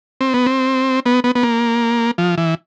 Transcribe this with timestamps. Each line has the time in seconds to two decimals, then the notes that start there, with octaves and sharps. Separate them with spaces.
0.21 C4
0.34 B3
0.46 C4
1.06 B3
1.24 B3
1.35 B3
1.43 A#3
2.18 F3
2.38 E3